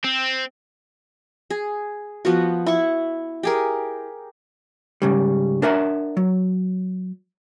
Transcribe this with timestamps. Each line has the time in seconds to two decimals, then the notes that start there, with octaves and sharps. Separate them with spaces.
0.04 C4
1.50 G#4
2.25 F3 B3 F#4
2.66 E4 C#6
3.43 G4 G#4 A#4
5.02 G#2 C#3 G3
5.62 D4 A#4 E5 F#5
6.17 F#3